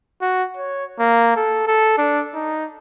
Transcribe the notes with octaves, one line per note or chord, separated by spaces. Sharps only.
F#4
C#5
A#3
A4
A4
D4
D#4